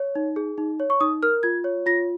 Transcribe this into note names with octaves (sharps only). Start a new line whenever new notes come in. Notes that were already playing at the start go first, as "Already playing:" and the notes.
Already playing: C#5
D#4
G#4
D#4
C#5
C#6
D#4 D#6
A#4 F6
F4 G#6
C#5
F4 A#6